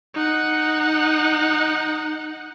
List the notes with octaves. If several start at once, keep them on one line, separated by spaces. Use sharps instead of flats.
D#4 F#5